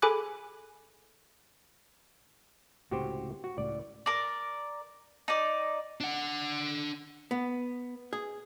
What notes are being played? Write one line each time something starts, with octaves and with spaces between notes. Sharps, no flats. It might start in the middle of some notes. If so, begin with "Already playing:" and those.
G#4 A4 G#5 B5 D6 F#6
C#2 A2 C3 F#4 G4 C5
F#4
C#2 A2 D5
A#4 D5
D#4 D5
D4 F#5
B3
G#4